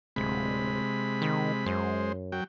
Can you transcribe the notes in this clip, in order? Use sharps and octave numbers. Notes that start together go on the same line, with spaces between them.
D1 C3 G#3 B5
D#3
F#2 G#3 C5
F#3 G5